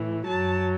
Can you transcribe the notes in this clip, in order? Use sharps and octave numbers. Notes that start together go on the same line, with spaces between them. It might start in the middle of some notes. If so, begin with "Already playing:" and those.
Already playing: A2 E3
F#2 F#3 A5